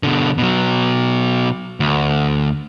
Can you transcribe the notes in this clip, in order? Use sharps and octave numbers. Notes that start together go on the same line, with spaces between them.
B2 D3
B2 F#3
D2